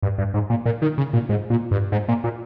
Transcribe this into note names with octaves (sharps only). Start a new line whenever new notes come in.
G2
G2
G#2
A#2
A#2
D#3
C#3
A#2
G#2
A#2
G2
G#2
A#2
A#2